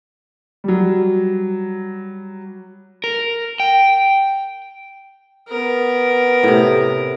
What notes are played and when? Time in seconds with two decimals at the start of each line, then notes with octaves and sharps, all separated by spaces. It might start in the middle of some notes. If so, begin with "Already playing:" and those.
0.64 F#3 G3
3.04 A#4
3.60 G5
5.48 B3 A#4
6.43 A2 C3